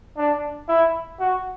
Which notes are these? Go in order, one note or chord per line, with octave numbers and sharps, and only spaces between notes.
D4
E4
F#4